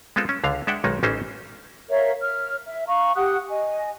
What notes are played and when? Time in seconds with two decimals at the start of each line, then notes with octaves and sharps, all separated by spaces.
0.16 G#3 B3 C4 F4 A4
0.29 C#4
0.44 C#2 D3 F5
0.67 G#3 D4 E5 F#5 G5
0.84 B1 D#3 G#3 D#4
1.03 A1 E3 C#4 D#4 C5
1.89 A#4 C#5 E5 F5
2.21 C#5 F6
2.67 E5
2.88 F5 A#5 C#6
3.15 G4 F#5 D#6 F#6
3.49 D#5 G#5